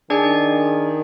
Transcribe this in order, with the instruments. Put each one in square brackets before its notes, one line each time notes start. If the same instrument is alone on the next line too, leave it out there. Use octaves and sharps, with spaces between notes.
[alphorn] D#3 [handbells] D4 G#4 D5 G#5